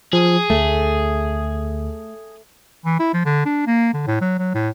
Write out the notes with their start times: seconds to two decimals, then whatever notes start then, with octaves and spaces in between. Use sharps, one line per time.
0.13 F3 G#4
0.50 D2 A3
2.85 E3
2.99 E4
3.14 F3
3.26 D3
3.45 D4
3.67 A#3
3.94 D3
4.07 A2
4.21 F#3
4.38 F#3
4.54 A2